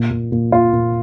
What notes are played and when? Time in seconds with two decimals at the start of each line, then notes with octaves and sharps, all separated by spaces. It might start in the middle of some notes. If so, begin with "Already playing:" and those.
Already playing: A#2
0.11 A#2
0.32 A#2
0.52 A#2 F4
0.73 A#2